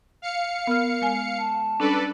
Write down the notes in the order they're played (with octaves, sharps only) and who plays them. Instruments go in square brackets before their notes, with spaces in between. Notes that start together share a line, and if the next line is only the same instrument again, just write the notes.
[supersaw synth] F5 C#7
[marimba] B3 F6 [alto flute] A#4
[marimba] G#3 G#5
[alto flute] A5
[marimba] G3 C#4 D4 [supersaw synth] A4 B4 D5